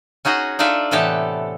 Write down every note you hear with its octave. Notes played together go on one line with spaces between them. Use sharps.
C#4 D#4 F#4 G#4 D#5
D4 D#4 F4 A4 D5 E5
A2 C3 E3 B3 G4 A4